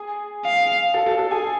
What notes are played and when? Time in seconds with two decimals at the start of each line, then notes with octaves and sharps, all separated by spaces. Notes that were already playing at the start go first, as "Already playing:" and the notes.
Already playing: G#4 G#5
0.45 F5
0.94 A4 A5
1.06 A4 A5
1.18 A4 A5
1.31 G#4 G#5